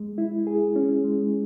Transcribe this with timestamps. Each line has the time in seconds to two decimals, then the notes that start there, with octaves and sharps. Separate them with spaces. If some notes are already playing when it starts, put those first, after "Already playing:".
Already playing: G#3
0.18 E4
0.47 G#4
0.76 C#4
1.04 G#3